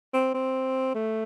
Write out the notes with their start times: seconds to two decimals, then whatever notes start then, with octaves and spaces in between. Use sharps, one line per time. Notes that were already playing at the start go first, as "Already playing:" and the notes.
0.14 C4
0.34 C4
0.95 A3